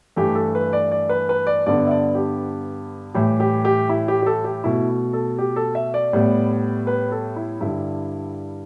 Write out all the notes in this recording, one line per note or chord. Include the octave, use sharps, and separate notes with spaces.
G2 E3 A3 G4
A4
B4
D5
D5
B4
B4
D5
G2 D3 B3 D5
E5
D5
G4
A2 E3 G3 G4
G4
G4
E4
G4
G4
A4
G4
B2 A3 E4
A4
G4
A4
E5
D5
A2 G3 B3
B4
A4
E4
G2 D3 G3 E4